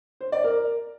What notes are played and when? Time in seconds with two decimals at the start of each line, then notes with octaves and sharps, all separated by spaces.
0.21 C5
0.32 D5
0.44 A#4